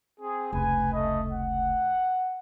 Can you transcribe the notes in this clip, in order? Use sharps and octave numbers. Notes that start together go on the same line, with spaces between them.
C4 G#4
F1 C#2 B4 G#5
A3 D#5
F#5